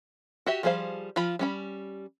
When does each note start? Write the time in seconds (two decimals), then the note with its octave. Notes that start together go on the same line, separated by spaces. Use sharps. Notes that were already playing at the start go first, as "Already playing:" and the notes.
0.46 F#4 G4 E5
0.63 F3 G3 G#4 C5 F5
1.16 F3 F4 B5
1.39 G3 C#4 B5